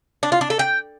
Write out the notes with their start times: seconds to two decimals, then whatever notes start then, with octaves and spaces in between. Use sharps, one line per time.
0.23 D4
0.32 F4
0.41 D4
0.50 A4
0.59 G5